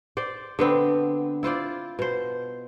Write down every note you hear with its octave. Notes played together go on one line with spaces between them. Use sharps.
C5 D5
D3 B3 C4
E4 F4 C5 D5
B2 C5